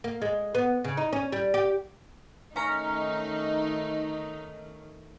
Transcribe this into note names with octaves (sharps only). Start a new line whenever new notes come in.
A#3
G#3
B3
C#3
D#4
C#4
G3
G4
D#3 A3 C#4 D#4 A#5